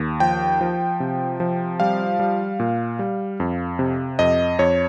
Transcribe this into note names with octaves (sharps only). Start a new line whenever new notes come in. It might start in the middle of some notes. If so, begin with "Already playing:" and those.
Already playing: D#2
F3 G5
F3
C3
F3
G3 F5
G3
A#2
G3
F2
C3
F2 D#5
F2 C#5